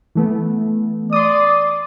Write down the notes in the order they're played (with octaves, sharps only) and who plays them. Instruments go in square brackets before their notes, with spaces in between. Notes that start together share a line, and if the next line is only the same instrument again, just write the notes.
[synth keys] E3 A3 B3
[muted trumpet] D5 [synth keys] C6 D#6